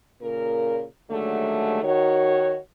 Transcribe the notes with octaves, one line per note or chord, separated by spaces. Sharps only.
A#2 C#3 A#4
D#2 D3 F#3 G#3 A3
D#3 F#4 C#5